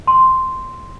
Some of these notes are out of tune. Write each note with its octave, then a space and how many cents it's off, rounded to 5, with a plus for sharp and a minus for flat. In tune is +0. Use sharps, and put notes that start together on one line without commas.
C6 -5